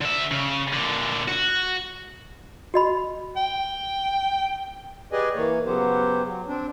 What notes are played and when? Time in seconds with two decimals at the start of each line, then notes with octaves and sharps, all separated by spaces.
0.01 D3 E5
0.31 C#3
0.73 A#2 D3
1.28 F#4
2.74 F#4 D#5 B5
3.36 G5
5.12 G4 G#4 B4 D5 D#5 G#5
5.35 E3 A#3 C#5
5.65 C#3 F#3 B3 G4 C5
6.24 F#3
6.48 C4 D4